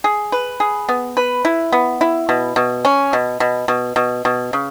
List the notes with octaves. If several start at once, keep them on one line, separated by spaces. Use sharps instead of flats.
G#4
B4
G#4
B3
B4
E4
B3
E4
B2
B2
C#4
B2
B2
B2
B2
B2
C#3